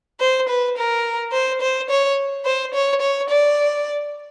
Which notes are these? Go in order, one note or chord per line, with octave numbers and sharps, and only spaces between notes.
C5
B4
A#4
C5
C5
C#5
C5
C#5
C#5
D5